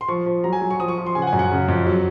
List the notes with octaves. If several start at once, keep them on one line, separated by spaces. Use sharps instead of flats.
C6
F3 C#6
F3
F#3 A#5
G#5
F#3
C#6
F3 D#6
C#6
F3
C6
C#3 G#5
F#5
G#5
F#2
F#5
C#3
F2
F#3